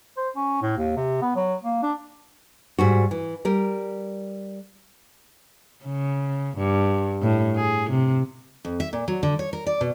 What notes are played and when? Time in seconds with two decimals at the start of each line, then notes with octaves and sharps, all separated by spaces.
0.17 C5
0.36 C#4
0.62 A2
0.77 D#2
0.97 C3
1.22 B3
1.36 F#3
1.64 A#3
1.82 D4
2.79 G#2 G3 F#4
3.11 E3
3.45 G3 A#4
5.85 C#3
6.57 G2
7.23 A2
7.56 G#4
7.90 C3
8.65 F2
8.80 E5
8.93 A#2
9.08 F#3
9.23 D3
9.39 C#5
9.53 A#4
9.66 D5
9.81 B2